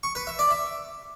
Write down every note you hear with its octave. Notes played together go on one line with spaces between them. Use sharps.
C#6
B4
E5
D5
E5